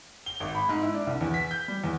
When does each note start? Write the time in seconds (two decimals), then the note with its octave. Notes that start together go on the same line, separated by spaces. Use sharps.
0.26 G7
0.40 G#1
0.55 B5
0.69 G#2
0.82 E4
0.94 D4
1.07 C2
1.21 E2
1.34 B6
1.51 G6
1.68 G3
1.84 E2